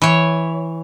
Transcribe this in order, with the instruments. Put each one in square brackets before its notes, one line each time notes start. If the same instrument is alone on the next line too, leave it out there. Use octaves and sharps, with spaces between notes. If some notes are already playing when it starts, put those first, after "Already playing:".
[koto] E3 C#5